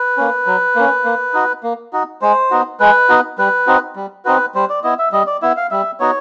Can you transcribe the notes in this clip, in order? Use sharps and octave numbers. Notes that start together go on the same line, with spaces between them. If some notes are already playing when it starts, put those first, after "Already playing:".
Already playing: B4
A#3 C#4
F#3
A#3 C#4
A#3
D#4 F#4
A#3
D#4 F#4
G#3 C5
B3 D#4 F#4
G#3 B4
B3 D#4 F#4
G3 B4
C4 D#4 F#4
G3
C4 D#4 F#4 B4
G3 C5
D5
B3 E4 D#5
E5
G3 D#5
D5
B3 E4 E5
F5
G3 E5
B3 D#4 F#4 C#5